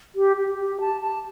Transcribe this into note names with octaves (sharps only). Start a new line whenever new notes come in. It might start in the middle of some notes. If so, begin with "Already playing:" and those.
G4
G4
G4
A5
A5